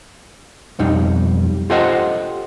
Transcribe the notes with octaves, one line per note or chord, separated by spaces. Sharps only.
B1 F2 G3 D#4
F4 G4 A4 C5 D#5 F#5